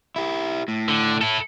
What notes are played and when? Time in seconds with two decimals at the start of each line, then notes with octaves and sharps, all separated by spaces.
0.16 E4 G4
0.68 A2
0.89 D3
1.21 E4 A4